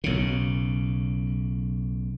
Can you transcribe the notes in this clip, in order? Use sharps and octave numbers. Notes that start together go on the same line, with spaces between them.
B1 C#3